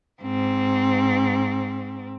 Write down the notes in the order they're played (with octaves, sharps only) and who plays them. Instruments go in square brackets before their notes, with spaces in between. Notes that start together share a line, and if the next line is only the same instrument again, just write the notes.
[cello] G#2 C4